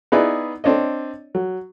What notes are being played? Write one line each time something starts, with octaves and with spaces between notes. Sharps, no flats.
B3 D#4 E4 G#4 B4 D5
C4 D4 C#5 D#5
F#3